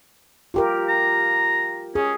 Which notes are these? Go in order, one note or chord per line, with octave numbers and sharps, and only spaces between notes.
F4 G4 A#4
A#5
C#4 G#4